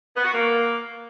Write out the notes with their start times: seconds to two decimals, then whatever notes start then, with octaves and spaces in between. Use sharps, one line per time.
0.15 B3
0.24 F#4
0.33 A#3